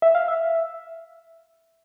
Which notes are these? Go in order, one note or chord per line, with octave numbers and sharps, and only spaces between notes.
E5
F5
E5